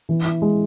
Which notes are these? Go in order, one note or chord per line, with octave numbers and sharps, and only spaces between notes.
E3
E4
G#3